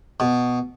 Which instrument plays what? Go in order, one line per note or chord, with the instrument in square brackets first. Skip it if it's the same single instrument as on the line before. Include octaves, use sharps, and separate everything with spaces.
[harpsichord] B2